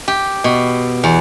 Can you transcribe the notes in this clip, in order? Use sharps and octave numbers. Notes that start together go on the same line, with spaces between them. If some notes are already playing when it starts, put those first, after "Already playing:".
G4
B2
E2